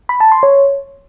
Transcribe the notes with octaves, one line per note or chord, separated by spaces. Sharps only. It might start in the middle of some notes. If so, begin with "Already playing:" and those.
B5
A5
C6
C#5